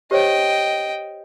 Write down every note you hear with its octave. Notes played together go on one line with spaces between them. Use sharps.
G4 C5 C#5 D#5 G5